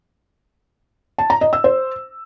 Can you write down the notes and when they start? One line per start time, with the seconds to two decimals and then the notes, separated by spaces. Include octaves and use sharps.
1.18 A5
1.30 A#5
1.41 D#5
1.53 E6
1.64 C5